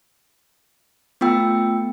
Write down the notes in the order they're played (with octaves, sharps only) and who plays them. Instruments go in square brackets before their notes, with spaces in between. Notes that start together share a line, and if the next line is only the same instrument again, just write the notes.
[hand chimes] A3 B3 F4 G5 E6